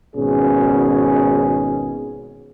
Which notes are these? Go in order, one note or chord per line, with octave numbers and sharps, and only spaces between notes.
G#1 B2 C#4 G#4